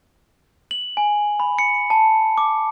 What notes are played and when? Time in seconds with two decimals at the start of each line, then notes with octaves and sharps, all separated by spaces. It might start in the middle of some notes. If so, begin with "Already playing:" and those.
0.71 F#7
0.97 G#5
1.40 B5
1.59 C#7
1.90 A5
2.38 D6